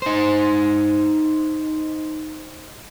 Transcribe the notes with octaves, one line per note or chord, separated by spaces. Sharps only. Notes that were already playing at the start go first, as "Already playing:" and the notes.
D#4 C5